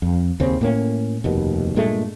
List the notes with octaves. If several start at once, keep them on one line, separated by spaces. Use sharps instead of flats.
F2
D#2 C#3 C4 C#4
A2 A#3 C#4
F1 D#2 B2
G2 A#2 G#3 A3